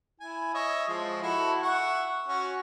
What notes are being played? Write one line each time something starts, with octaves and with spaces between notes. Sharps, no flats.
E4 G#5
C#5 D#5 E5
F3 G#3
E4 F#4 A4
E5 F#5 C#6
C#4 F#4